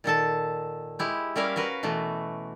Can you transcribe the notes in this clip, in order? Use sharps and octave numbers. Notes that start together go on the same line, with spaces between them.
A#2 D#3 A4 A5
G#3 E4 G4
G3 A#3 C#4 A#4 E5 F5
F#4 A#4 B4 F5
B2 E3 A3